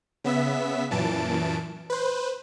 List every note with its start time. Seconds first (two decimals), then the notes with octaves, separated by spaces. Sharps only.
0.24 C#3 B3 E5 B6
0.91 F#2 A#2 E3 A5 D7
1.90 B4 C5